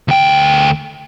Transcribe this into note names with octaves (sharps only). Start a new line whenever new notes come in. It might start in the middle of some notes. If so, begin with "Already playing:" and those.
D2 G5